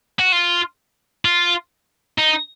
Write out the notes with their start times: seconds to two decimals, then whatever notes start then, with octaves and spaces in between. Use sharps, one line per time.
0.19 F#4
0.33 F4
1.25 F4
2.18 D#4